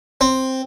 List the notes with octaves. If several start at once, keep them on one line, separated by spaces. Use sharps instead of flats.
C4